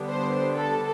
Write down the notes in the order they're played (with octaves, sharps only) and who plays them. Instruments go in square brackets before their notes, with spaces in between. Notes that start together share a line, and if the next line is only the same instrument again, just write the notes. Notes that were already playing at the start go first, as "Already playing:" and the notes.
Already playing: [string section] D3 G3 B3 D4
C5
A4